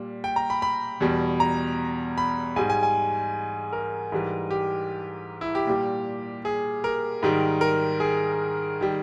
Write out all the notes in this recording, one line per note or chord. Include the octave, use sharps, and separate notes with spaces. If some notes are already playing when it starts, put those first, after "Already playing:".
Already playing: A#2 G3
G5
A#5
B5
B5
E2 B2 G3
A#5
B5
G#2 G3 G#5
G#5
G#5
A#4
G#2 E3 G3
G4
E4
G4
A#2 G3
G#4
A#4
G#2 D#3 G3
A#4
G#4
D#3 G3